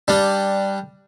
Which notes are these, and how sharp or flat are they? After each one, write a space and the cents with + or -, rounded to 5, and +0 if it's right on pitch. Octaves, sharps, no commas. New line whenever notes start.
G3 +5 D4 +0